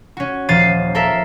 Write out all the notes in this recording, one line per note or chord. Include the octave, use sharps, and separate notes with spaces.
C#4 F#4
D#1 F3 C5 F5 A6 D#7
A4 A#4 E5 F5